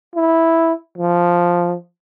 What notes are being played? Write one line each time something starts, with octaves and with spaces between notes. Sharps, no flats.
E4
F3